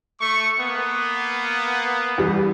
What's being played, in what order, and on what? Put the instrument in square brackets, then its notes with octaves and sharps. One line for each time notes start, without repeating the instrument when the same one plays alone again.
[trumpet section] A3 C#6
A#3 B3
[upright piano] E2 G3